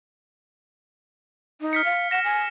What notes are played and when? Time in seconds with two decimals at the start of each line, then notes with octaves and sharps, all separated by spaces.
1.61 D#4
1.73 F6 B6 C#7
1.85 F5
2.11 F#5 A#6 E7
2.24 G#5